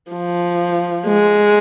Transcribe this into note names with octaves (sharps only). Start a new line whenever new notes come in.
F3
G#3